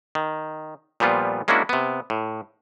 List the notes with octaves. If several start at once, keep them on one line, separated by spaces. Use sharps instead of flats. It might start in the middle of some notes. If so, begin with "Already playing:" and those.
D#3
A#2 F3 G3 B3 F4
G#3 A#3 C#4 D4 E4 F#4
C3 B3
A2